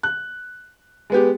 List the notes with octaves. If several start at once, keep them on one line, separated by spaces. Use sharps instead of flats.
F#6
G#3 B3 G4